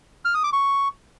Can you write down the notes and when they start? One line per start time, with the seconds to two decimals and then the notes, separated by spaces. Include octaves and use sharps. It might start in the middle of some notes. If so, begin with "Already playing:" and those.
0.25 F6
0.34 D#6
0.44 D6
0.53 C#6